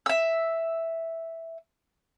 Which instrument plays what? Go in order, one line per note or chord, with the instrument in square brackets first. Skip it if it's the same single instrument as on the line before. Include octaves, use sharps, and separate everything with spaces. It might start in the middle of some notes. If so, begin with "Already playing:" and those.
[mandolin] E5 E6